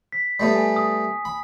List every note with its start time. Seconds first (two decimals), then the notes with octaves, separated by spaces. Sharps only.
0.12 B6
0.40 G3 A3 B3
0.55 G#5
0.76 D#6
1.25 B5